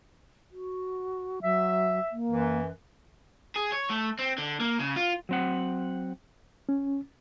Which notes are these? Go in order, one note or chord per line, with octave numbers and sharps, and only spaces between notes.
F#4
F#3 E5
A#3
F#2 E3
G#4
C#5
A3
C4
D3
A#3
C#3
F4
F#3 C4 F#5
C#4